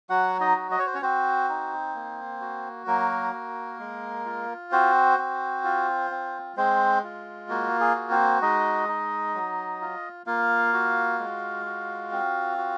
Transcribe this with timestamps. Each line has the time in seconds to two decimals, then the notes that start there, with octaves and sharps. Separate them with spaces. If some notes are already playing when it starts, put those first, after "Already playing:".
0.10 F#3 F#4 F#5
0.40 D#4 D#5
0.56 F#4
0.71 D#5
0.79 C#5
0.87 C5
0.94 C#4 C#5
1.02 C4 F#4 C5
1.49 D#4
1.95 A#3
2.41 F#4
2.87 F#3 A#3 A#4
3.33 F#4
3.80 G#3
4.25 F4
4.72 C4 F#4 C5
5.18 C4
5.64 F4
6.10 C4
6.57 G#3 C4 C5
7.03 F4
7.49 A#3 F#4
7.80 G#4
7.95 F#4
8.11 C4 C5
8.42 G#3 D#4 D#5
8.88 D#4
9.34 F#3
9.81 F4
10.27 A#3 F4 F5
10.73 F#4
11.19 G#3
11.66 F#4
12.12 C4
12.58 F#4